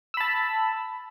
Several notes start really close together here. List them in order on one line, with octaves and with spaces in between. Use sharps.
E6 B5 A5